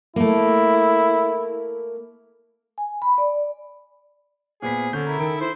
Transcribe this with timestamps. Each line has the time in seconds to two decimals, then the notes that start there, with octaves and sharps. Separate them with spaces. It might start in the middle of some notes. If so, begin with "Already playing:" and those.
0.16 A3 A#3 E4
2.78 G#5
3.02 B5
3.18 D5
4.62 A#2 B3 G#4 C5 B6
4.93 D3 C#4 G6
5.06 E4 A#4 A#5
5.19 D#3 D#4 A4 D7
5.41 E4 C5